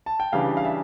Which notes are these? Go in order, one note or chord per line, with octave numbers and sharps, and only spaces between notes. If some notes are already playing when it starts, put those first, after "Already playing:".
A5
G5
C#3 E3 G3 D4 F5
F5
E5